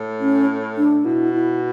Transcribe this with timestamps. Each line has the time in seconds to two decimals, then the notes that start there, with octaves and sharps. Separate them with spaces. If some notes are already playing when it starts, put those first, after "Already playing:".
Already playing: A2
0.20 C#4
0.77 D4
1.05 B2 E4
1.34 E4